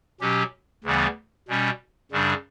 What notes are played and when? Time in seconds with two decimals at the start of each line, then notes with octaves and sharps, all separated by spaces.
0.21 B2 F#3 C#4 G4
0.84 D2 C#3 E3 G3 B3
1.48 B2 G3 C#4
2.11 F#2 C#3 G3 D4